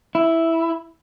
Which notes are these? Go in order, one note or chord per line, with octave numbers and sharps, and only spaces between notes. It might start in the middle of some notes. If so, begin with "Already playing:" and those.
E4